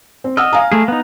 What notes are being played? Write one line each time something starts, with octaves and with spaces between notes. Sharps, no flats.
C4
D#5 F#5 E6 F6
F5 G#5 A#5
A3 G#4
B3 D#4